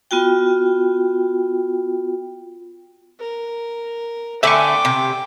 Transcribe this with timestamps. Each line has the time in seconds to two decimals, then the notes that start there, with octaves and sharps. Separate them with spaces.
0.11 B3 F4 F#4 G5
3.20 A#4
4.43 D3 A3 E5 G5 G#5 B5 C#6 D6
4.85 C3